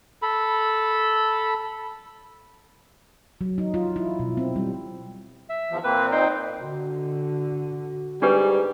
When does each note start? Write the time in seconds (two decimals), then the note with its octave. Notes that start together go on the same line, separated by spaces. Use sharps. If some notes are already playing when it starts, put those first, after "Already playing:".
0.22 A4 B5
3.41 F#3
3.58 D#4
3.74 F4
3.96 E4
4.19 B2
4.37 C4
4.56 G3
5.49 E5
5.70 E2 F3
5.84 A#2 A#3 C4 B4
6.12 D#4 C5 G5
6.62 D3 F#4
8.22 G#2 G3 D4 G4 B4